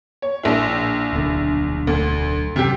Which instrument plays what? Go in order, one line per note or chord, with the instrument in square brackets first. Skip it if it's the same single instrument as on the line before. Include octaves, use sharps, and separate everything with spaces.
[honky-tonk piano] C#5
A#1 E4
[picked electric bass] D1 B1 D3
[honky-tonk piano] D2
[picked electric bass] F#2 [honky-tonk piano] C3 G4